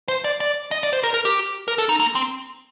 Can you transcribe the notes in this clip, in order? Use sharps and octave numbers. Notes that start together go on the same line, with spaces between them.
C5
D5
D5
D#5
D5
C5
A#4
A#4
G4
A#4
A4
D#4
A#3
C4